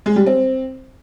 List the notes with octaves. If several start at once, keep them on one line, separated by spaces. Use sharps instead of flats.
G#3
G3
C4